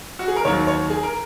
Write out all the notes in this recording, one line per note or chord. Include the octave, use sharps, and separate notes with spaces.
F#4
G#4
A#4
D#2 D#3 F#3 C#5
C#5
G#4
A#4